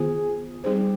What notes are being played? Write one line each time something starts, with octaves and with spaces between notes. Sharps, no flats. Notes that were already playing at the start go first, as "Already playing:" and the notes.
Already playing: D#3 B3 F4 G#4 C5
G3 C4 D#4 G4 G#4 C5